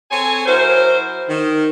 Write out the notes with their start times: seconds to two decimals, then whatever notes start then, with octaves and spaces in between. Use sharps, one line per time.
0.11 C4 A4 C#5 G#5
0.46 F#3 E4 A#4 C5
1.29 D#3